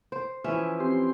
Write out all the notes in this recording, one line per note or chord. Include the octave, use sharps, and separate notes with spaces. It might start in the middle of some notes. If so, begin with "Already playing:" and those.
C5
E3 F3 C#4 E4 E5
C4 G4 C6